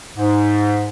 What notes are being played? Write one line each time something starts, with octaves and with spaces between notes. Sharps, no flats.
G#2